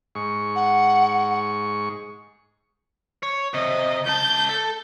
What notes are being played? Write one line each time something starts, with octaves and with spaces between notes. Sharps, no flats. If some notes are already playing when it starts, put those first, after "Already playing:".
G#2 C#6
F#5
C#5
C3 D#5
C#2 A5 G6
A4